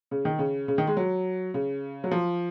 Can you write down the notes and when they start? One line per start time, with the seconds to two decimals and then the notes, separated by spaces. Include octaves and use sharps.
0.11 C#3
0.25 D#3
0.39 C#3
0.68 C#3
0.78 D#3
0.87 G#3
0.97 F#3
1.54 C#3
2.04 F#3
2.11 F3